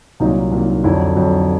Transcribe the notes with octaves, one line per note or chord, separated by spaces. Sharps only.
C2 A#2 F#3 D#4
C2 A#2 F#3
F2 D3 F#3 E4
F2 D3 F#3